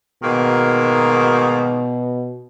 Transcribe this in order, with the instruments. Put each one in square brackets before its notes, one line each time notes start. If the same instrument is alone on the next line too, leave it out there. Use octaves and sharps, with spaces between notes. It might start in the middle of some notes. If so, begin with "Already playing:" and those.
[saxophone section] G#2 D#3 A#3 [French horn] B2